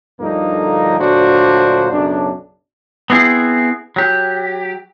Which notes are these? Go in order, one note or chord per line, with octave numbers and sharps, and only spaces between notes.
D2 G2 D3 F3 A#3 D#4
D2 A#2 F#3 D4 F#4 C5
B1 F#2 C#3 D4
B3 C4 E4 G#4
F#3 G4